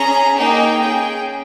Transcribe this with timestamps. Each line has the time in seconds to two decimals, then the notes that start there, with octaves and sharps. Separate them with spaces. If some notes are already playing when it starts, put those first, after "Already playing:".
Already playing: C#4 G#4 A#5
0.38 A#3 D#4 G#4 G5
0.83 C#4 G#4